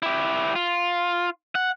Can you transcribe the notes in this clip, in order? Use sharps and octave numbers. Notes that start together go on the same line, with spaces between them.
E4 G4
F4
F#5